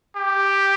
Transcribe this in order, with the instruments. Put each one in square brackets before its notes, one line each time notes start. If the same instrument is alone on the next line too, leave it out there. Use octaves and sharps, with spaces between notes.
[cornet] G4